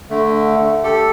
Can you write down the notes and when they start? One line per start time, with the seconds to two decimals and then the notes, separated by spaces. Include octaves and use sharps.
0.10 D3 A3
0.84 G4 A4